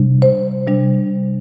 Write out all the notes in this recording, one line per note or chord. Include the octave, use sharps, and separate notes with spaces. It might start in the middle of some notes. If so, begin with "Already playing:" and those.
Already playing: C3 G3 D4
C5
C3 G3 D4